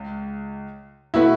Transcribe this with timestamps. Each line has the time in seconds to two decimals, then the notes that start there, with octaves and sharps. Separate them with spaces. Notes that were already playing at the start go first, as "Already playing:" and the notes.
Already playing: C#2
1.14 B2 A3 E4 F#4 B4